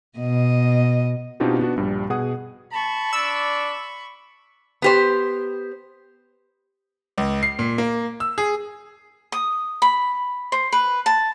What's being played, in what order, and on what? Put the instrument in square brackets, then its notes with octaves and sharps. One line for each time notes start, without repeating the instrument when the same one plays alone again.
[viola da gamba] B2 D#5
[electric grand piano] B2 C4 D4 D#4 F4 G4
B3 D4 F#4
A#1 G2 G3
B2 G#4 F#5 D#6
[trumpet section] A5 [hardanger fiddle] B5 C#6
[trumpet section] D4 D5 [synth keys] E6
[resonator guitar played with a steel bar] B3 G4 C5
[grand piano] C#2
C7
A#2
A#3
E6
G#4
[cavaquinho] D#6
B5
C5
B4
A5